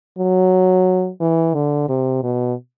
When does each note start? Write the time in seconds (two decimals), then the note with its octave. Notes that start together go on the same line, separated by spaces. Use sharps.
0.18 F#3
1.21 E3
1.54 D3
1.89 C3
2.23 B2